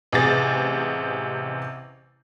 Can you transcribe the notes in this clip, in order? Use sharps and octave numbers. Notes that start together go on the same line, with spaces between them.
A1 C3 G#4 A6